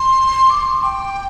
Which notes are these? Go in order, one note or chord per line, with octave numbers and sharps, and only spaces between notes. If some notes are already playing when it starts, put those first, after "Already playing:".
Already playing: C6
D6
C6
D6
G5